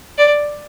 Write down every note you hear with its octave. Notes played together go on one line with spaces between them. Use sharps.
D5